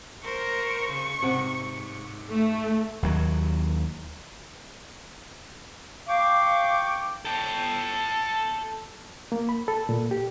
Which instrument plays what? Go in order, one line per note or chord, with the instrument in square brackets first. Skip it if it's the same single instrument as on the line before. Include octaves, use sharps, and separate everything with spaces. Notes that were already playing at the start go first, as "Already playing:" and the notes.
[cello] A#4 C5 [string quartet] C#6
[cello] C#3
[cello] G#2 [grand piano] C3 C4 F#5
[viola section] A3
[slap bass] D#2 F#3
[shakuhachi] F5 [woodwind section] G5 C#6 D6
[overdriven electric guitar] A4 G5
[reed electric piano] A#3
B5
A4
A#2
G4